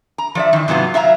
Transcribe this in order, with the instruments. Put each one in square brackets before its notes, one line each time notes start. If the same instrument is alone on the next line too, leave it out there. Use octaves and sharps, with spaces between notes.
[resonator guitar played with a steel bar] A#5
F3 D5 E5
D#3 E3
G#2 C3 F#3 B3 F4
F#3 E5 F5 A#5